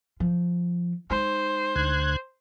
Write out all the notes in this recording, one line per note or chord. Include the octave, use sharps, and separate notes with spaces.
F3
G#3 D#4 C5
D2 F#6 G#6